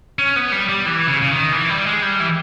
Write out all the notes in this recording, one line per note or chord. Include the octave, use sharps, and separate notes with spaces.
C#4
B3
G3
G3
E3
C#3
C#3
D#3
E3
G3
G#3
G3
E3